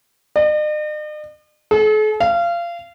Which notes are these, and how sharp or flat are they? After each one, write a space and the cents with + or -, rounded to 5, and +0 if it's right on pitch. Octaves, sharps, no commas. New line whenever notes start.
D#5 -45
A4 -45
F5 -25